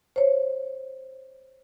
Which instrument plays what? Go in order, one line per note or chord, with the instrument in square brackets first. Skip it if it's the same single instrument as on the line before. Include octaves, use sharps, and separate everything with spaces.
[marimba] C5 C#5